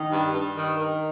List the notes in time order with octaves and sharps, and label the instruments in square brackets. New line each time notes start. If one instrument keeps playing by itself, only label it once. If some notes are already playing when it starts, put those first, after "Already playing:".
Already playing: [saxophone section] D#3
G2
G2
D#3
D#3